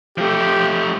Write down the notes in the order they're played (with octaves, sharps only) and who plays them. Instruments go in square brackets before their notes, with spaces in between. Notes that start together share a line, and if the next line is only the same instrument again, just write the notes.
[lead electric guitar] F3 A3 [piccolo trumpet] G4